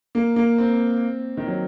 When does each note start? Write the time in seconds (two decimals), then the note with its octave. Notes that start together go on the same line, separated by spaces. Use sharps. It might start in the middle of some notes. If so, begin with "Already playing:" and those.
0.15 A#3
0.36 A#3
0.58 C4
1.37 D#3
1.47 F#3